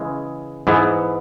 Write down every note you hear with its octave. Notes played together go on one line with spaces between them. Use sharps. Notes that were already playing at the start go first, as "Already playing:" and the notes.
Already playing: C#3 E3 G#3
G#2 E3 B3